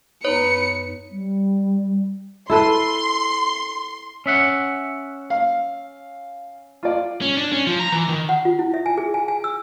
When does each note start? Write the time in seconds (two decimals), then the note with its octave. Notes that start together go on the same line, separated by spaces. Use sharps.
0.25 F#2 B3 D#4 B4 C#5 C#7
1.12 G3
2.50 E4 A4 B4 C6
4.26 C#4 E5 F#5
5.30 F5
6.83 F4 D5
7.22 C#4
7.37 D4
7.53 C#4
7.67 F3
7.80 A#5
7.92 E3
8.08 D#3
8.29 F#5
8.45 F4
8.59 E4
8.74 E5
8.86 G#5
8.98 G#4
9.14 G#5
9.28 G#5
9.44 E6